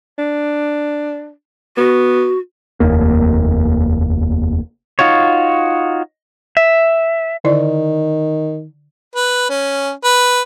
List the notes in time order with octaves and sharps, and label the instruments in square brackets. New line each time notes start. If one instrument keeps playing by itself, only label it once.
[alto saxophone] D4
[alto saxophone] B3 [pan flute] F#4
[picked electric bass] F1 D#2 A#3
[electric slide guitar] D#4 F4 F#4 C#5
E5
[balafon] D3 E4 D5 [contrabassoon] D#3
[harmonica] B4
C#4
B4